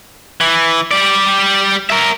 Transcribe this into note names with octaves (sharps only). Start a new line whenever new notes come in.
E3
G3 D5
A#4 E5